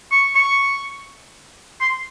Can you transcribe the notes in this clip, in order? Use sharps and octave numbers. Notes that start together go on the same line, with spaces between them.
C#6
C#6
C6